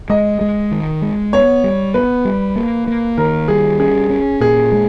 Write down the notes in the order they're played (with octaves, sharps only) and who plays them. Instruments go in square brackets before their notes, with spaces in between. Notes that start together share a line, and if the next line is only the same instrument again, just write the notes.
[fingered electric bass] G#3 [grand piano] D#5
[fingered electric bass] G#3
D#3
G#3
[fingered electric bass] B3 [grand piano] C#5
[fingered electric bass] G3
[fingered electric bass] B3 [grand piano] B4
[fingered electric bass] G3
A#3
A#3
[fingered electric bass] D#3 [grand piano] A#4
[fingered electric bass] G3 [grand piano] G#4
[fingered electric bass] C#4 [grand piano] G#4
[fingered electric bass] C#4
[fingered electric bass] A#2 [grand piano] G#4
[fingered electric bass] G#3